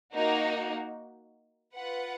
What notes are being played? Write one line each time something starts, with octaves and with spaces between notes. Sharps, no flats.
A#3 D#4 F#4
F4 B4 F#5